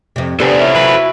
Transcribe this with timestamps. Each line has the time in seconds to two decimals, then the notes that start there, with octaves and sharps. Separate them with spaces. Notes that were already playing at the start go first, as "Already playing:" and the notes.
0.16 F2 C3
0.40 B3 D4 G4 A4 C5 G#5
0.60 C#4 E4
0.75 F#3 B4